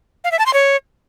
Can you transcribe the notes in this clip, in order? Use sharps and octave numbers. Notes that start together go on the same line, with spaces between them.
F5
E5
A5
C6
C#5